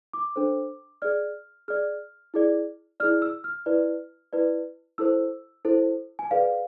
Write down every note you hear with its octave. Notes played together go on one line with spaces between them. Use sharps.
D6
D4 A4 C5
G#4 D5 F6
G#4 D5 F6
E4 G#4 D5
E4 G#4 D5 F6
E6
F6
E4 B4 D5
E4 B4 D5
E4 A4 C5 E6
E4 A4 C5
G#5
G#4 B4 D5 F5